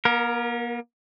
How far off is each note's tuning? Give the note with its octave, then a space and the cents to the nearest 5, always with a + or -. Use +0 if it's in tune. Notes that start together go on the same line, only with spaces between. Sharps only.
A#3 +45 A#4 +0